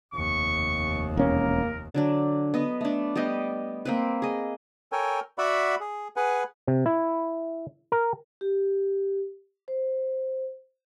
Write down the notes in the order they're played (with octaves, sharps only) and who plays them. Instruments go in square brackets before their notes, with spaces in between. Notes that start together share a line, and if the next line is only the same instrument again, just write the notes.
[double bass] F1 D#2 [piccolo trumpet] C#6
[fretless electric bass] E1 C#4 [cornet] A#3 [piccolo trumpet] A#4
[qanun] D3 F#3 D4
B3 D#5
A3 D4
G3 B3 G4 D#5
A#3 C4 B4
G#4 D#5
[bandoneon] A4 A#4 C#5 G5 G#5
F#4 D5 E5 F#5 B5
G#4
G#4 B4 F#5 G#5
[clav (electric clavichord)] C3
E4
A#4
[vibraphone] G4
C5